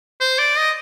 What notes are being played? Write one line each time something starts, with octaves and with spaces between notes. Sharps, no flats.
C5
D5
D#5